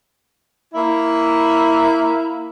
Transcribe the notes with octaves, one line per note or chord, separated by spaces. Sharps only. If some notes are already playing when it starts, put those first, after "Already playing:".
A#3 E4